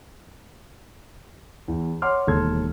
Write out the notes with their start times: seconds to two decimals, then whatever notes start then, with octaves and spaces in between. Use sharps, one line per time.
1.68 E2
2.02 C#5 F#5 C6 D6 F6
2.27 E1 D#2 A4 C6 G#6